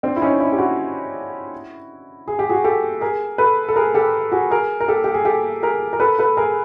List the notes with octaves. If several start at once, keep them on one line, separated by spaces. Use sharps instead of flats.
C4 D4
E4
C#4 D#4
D4 E4
G4
E4 F#4
G#4
G4
F#4 G#4
G4 A4
G#4 A#4
A4 B4
A4
G#4 A#4
G4 A4
F#4 G#4
G#4 A#4
A#4
G4 A4
G4
G#4
G4 A4
G#4 A#4
A#4
A4 B4
A4 B4
G#4 A#4